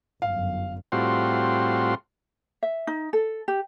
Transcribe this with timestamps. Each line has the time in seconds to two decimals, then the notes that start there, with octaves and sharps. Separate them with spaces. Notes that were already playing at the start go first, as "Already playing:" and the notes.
0.22 G1 F#2 F5
0.92 A2 G3 C4 F4 F#4 C6
2.63 E5
2.87 D#4
3.13 A4
3.48 G4